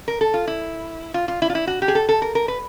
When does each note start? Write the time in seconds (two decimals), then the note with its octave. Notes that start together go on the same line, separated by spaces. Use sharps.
0.08 A#4
0.21 A4
0.34 F4
0.47 E4
1.14 F4
1.28 F4
1.42 E4
1.50 F4
1.55 E4
1.67 F#4
1.82 G4
1.88 G#4
1.95 A4
2.09 A4
2.22 A#4
2.35 A#4
2.48 B4